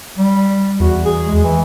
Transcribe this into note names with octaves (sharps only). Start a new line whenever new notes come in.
G3
E2 F#4
G#4
G#3
E3